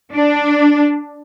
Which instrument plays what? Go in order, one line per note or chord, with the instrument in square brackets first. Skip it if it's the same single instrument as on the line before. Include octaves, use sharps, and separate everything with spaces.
[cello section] D4